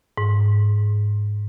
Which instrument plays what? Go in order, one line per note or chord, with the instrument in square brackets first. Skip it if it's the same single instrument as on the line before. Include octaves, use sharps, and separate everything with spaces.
[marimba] G#2